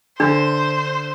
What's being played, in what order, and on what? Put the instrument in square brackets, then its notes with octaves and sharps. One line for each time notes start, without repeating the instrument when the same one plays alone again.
[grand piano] D3 [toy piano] D4 [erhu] C5